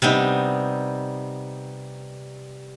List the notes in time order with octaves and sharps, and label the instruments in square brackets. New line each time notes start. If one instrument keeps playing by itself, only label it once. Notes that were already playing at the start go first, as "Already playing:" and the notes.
[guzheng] C3 G3 B3 D#4